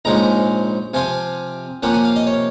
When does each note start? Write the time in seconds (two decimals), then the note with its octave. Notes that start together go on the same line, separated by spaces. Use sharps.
0.05 A#1 G#2 F3 G#3 C#4 A#5
0.93 C3 F3 C4 F4 G#5
1.83 C3 F3 A#3 C#4 F4 F#5
1.94 G#5
2.05 F5
2.16 D#5
2.27 C#5